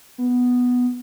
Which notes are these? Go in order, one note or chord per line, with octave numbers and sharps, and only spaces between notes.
B3